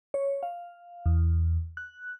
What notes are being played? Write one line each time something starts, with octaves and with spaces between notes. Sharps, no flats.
C#5
F5
E2
F#6